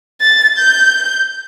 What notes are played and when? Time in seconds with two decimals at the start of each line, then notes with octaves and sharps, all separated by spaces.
0.21 A6
0.58 G6